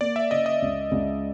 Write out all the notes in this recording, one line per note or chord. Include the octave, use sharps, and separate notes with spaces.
A#3 D5
E5
C#3 D#5
D#5
C#2
C#2